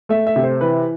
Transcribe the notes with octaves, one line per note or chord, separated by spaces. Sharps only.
A3 E5
E5
C3
C5
E3 B4